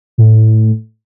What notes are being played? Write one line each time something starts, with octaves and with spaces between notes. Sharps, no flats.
A2